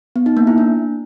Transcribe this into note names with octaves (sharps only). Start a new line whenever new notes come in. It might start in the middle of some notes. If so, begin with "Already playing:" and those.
B3
D#4
A#3
E4
D4